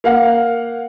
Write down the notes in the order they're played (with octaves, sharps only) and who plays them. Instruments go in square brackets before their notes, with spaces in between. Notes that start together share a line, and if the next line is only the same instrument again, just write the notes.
[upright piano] A#3 F5 F#5